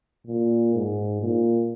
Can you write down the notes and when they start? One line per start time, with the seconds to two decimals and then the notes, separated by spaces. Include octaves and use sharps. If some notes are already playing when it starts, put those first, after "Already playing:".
0.27 A#2
0.74 G#2
1.21 A#2